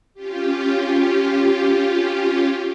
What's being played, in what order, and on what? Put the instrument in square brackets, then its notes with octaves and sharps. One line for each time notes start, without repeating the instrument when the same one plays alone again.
[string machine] C#4 F4 G4